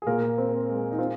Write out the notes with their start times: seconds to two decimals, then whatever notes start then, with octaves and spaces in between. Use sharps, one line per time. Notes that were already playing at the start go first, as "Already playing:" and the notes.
0.02 G#4
0.06 A#2 A#3 A#4
0.38 C4
0.69 G#3
0.92 D#4
0.98 C4 F4